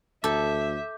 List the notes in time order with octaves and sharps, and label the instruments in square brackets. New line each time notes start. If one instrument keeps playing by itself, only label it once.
[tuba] D2 [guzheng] A4 [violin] E5 [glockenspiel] D6 G6